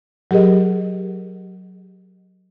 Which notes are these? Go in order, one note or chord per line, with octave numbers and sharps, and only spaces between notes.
F#3 G4 G#4 A#4 D#5